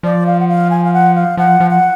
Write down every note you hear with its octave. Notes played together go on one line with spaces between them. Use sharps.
F3 D5
F5
F#5
F5
G#5
F5
F#5
F5
F3 F#5
F3
F#5